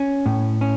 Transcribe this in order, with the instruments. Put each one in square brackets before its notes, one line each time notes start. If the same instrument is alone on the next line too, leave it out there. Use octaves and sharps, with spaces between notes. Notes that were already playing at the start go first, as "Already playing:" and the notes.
Already playing: [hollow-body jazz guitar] C#4
A2
C#4